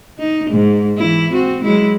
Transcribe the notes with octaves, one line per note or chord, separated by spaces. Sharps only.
D#4
G#2
E3 E4
C4 F#4
F#3 G#3 E4